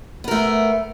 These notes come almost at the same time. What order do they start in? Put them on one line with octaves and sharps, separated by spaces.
B3 A#4 A3